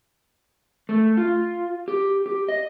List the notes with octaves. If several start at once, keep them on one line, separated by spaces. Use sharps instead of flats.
A3
F4
G4
G4
D#5